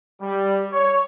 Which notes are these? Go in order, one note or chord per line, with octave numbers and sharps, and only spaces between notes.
G3
C#5